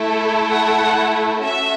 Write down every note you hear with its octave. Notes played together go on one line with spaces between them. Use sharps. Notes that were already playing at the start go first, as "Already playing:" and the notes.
Already playing: A3 E4 A4
F#5
C#4 F#4 A4 E5